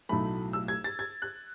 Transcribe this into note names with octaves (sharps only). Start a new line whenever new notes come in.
B1 A2 F#3 A3 B5
E6
G#6
A6
G#6
F#6